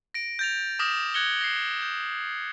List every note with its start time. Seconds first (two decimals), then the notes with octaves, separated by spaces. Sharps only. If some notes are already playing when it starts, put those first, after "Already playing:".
0.14 A#6 D7
0.39 G6 A6 F7
0.79 D6 D#6 F6 A#6 E7
1.14 F#6 G#6 A#6 C#7 F#7 G7
1.41 A#6 C7
1.82 G6